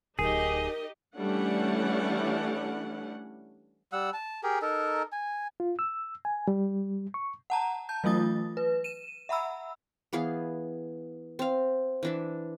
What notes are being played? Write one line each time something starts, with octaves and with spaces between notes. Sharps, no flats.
D1 D#4 G4 G#4 A#4 D#5
E3 G3 A3 C#4 D4 F#5
G3 F#5 E6
A5
G4 G#4 A#4
D#4 A4 A#4
G#5
F4
E6
G#5
G3
C#6
F#5 A5 A#5
A5 G6
E3 F#3 A3 F4 D#6 A6
B4
D#7 E7
E5 F#5 A#5 B5 E6
E3 B3 G#4 F5
C4 F5
E3 D4 E5